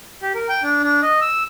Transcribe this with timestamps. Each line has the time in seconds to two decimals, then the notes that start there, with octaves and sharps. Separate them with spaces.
0.22 G4
0.35 A#4
0.49 G5
0.63 D4
0.83 D4
1.02 D#5
1.21 E6